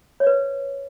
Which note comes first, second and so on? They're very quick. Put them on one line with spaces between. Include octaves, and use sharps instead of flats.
C#5 D5 B4